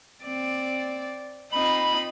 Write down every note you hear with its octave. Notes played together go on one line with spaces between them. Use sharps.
C4 D5
C4 D#4 F4 B5